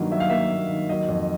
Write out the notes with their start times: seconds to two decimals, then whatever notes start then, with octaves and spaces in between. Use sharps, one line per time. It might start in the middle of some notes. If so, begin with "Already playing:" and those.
Already playing: G2 D#3 F#3 A#3
0.12 F#3 E5
0.20 F5
0.30 A#3 E5
0.51 A#3
0.70 D#3
0.89 F#3 D#5
1.09 F2